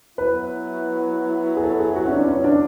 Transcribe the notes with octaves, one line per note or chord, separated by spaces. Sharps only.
F#3 B3 E4 B4
G#4
A4
G#4
F#4
C#4
D4
C#4
D4